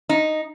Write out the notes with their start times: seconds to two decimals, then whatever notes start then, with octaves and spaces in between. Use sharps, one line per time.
0.09 D#4